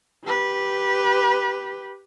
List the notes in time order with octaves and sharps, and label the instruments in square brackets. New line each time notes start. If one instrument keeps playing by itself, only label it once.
[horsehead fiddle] G4 B4